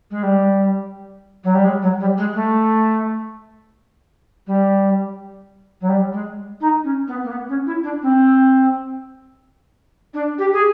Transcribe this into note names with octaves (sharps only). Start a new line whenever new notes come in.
G#3
G3
F#3
G3
G#3
F#3
G3
G#3
A3
G3
F#3
G3
G#3
D#4
C#4
B3
A#3
B3
C#4
E4
D4
C4
D4
G4
G#4